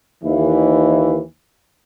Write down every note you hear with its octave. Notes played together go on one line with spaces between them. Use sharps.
D#2 E3